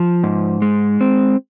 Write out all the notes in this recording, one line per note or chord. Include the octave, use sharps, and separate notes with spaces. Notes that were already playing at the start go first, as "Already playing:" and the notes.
Already playing: F3
G#2
G#3
C4